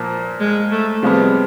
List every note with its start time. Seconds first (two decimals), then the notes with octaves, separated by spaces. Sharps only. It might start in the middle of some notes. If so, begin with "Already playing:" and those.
Already playing: A#2 F3 A#3
0.40 G#3
0.71 A3
1.03 C3 F3 G3 G#3 B3